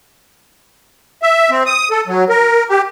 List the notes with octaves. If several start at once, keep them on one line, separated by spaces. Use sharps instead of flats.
E5
C4
D#6
A4
F#3
A#4
G4